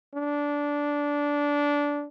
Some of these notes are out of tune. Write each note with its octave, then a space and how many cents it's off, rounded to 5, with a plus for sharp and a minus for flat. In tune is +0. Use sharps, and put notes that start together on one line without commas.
D4 -15